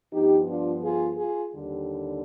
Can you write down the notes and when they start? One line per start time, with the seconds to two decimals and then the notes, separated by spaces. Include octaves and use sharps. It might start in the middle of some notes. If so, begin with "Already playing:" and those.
0.12 G2 F3 B3 D#4 G4
0.47 D4 F4
0.83 F4 G#4
1.17 F4 G#4
1.53 D#2 D3 G3